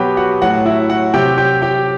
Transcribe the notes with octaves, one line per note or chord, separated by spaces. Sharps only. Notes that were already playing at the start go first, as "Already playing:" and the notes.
Already playing: B2 F#3 B3 G4 B4 G5
F#4 F#5
A2 F#3 F#4 F#5
E4 E5
F#4 F#5
C3 F#3 G4 G5
G4 G5
G4 G5